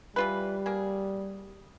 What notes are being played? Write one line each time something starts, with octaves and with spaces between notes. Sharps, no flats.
E3 G3 F4 B4
A#3 G#4